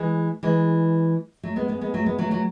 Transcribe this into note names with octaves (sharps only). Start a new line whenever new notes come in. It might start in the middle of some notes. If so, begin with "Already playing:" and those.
Already playing: E3 G#3
E3 G#3
F#3 A3
G#3 B3
G#3 B3
G#3 B3
F#3 A3
G#3 B3
F#3 A3
F#3 A3